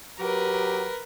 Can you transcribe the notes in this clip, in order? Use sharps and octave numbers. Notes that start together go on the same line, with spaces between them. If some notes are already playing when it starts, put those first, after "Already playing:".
F#3 G4 A#4 B4